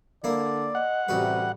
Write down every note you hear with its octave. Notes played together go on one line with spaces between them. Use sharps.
D3 A#3 E4 D5
D#5 F#5
A1 C3 G3 F#4 B4